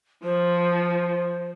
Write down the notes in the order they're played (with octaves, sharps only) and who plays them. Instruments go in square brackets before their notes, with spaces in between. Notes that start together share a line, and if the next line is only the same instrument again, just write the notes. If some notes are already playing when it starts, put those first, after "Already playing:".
[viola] F3 [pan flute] C5